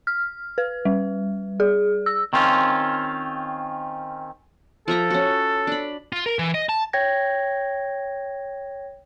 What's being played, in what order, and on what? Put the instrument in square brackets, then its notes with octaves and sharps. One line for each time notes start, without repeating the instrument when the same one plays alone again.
[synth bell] F6
B4
G3
G#4
E6
[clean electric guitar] D#3 C4 C#4 F4
[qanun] F3 E5 A#5 [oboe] A4
[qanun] C#4 F#4
D4 B5
[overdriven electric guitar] F4
A#4
E3
D#5
A5
[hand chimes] C#5 G5 G#6 A#6